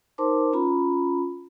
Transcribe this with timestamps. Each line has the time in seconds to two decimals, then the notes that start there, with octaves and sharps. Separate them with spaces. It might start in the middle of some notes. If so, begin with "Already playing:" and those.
0.18 D#4 A#4 C5 A5 C6 D6
0.52 C#4 F4 A#5 B5